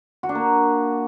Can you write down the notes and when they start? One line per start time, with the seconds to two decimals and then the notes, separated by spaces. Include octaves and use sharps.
0.23 F#4
0.29 D4
0.35 A#3